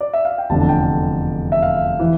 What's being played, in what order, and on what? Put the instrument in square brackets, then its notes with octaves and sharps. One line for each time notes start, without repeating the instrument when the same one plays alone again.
[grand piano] D5
E5
F5
G5
F1 E2 D3 A5
A5
G5
E5
F5
E3